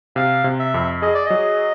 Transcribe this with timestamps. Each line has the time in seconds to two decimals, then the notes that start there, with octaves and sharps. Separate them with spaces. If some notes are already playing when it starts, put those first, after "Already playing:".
0.16 C3 F5
0.44 C3
0.59 E5
0.74 F2
1.02 G#4 D#5
1.14 D5
1.26 F#3 D#5